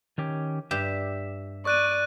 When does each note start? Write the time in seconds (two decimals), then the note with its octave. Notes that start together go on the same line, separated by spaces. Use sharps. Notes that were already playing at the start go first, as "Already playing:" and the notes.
0.18 D#3 C#4 G4
0.71 G2 G4 E5
1.65 D5 C#6 F#6 D#7